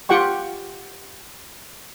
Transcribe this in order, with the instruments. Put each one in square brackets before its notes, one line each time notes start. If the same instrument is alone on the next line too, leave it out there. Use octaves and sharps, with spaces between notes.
[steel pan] F4 G4 F#5 G5 C#6